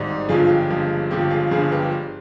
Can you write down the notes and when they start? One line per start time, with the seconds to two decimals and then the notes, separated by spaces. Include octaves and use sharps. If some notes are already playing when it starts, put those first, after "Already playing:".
Already playing: G#1 G#2 G3
0.29 G1 G2 F3 G#3 F4 G#4
0.49 G4
0.70 G1 G2 F3 G#3
1.10 G1 G2 F3 G#3 G4
1.31 F4 G#4
1.51 G1 G2 F3 G#3 F4 G#4
1.72 G4 B4